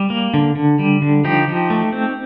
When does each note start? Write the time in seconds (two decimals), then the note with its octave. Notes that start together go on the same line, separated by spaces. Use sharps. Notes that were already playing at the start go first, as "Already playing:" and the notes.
Already playing: G3
0.10 A#3
0.34 D3
0.55 D3
0.79 G3
1.02 D3
1.24 F3 D#4 G4
1.48 F3
1.70 A3
1.93 C4